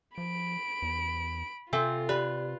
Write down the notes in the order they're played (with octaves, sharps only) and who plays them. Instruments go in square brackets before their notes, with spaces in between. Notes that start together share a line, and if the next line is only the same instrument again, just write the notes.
[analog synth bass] F3 [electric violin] B5 D7
[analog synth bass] E2
[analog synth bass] C3 [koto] C4 [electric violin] F4 [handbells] A4 E5 G#5
[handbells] G4 D5 [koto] B4